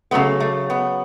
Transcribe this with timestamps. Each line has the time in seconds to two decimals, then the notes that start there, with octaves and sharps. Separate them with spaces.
0.11 C#3 F#3 A3 B3
0.40 A3
0.70 B3